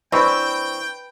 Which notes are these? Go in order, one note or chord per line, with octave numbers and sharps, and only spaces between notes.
E3 C4 D4 B4 G5 C#6